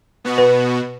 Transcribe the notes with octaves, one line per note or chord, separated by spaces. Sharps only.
B2 B3 F#4
B4